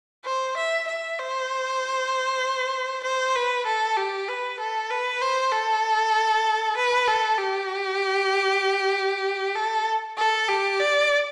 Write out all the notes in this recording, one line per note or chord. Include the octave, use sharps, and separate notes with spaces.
C5
E5
E5
C5
C5
B4
A4
G4
B4
A4
B4
C5
A4
B4
A4
G4
A4
A4
G4
D5